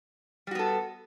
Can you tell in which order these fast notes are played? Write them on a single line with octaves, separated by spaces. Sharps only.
G3 F#4 B3 A4